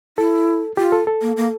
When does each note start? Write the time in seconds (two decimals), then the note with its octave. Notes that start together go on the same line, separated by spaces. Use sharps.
0.18 E4 A4
0.77 F4 G4
0.92 A4
1.07 A4
1.22 A#3
1.37 A#3